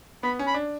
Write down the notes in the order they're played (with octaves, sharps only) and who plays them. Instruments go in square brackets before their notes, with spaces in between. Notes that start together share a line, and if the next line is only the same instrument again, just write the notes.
[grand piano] B3 [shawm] B5
[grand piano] C#4
[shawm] B5
[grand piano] D4